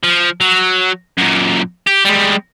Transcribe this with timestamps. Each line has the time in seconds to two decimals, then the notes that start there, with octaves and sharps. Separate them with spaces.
0.03 F3
0.41 F#3
1.18 F#2 A#2
1.87 G4
2.05 G3 G#3